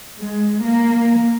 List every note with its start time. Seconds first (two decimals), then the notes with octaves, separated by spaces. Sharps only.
0.19 G#3
0.65 A#3